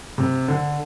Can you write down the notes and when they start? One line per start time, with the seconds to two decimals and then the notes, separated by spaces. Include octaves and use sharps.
0.18 C3
0.48 D3